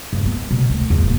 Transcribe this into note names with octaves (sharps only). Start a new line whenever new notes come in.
G2
B3
B2
D2
E2
D#1